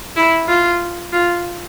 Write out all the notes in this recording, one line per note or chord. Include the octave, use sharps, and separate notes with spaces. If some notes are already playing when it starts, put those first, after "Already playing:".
E4
F4
F4